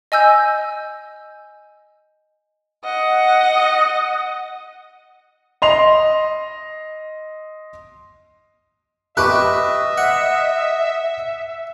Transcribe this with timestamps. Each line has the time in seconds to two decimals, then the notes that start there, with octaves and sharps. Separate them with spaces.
0.12 D#5 G#5 E6 G6
2.84 D#5 F#5
5.62 D#5 C6 F7
9.17 G4 B4 D#5 E5 C#6 D6 F#6
9.98 F#5